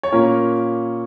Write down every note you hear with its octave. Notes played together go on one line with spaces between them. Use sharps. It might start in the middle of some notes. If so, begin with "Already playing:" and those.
C#5
A#2 A#3 C#4 A#4